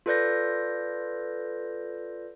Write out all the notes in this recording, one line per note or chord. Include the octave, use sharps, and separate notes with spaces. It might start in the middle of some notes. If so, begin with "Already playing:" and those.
F4 A4 B4 D5 G6 A#6